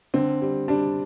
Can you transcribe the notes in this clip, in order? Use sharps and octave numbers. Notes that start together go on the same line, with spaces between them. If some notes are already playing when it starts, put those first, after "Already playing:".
D3 C4
G3
G3 D4